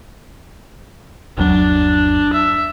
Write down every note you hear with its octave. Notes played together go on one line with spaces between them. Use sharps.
G1 D#2 F#3 D4
E5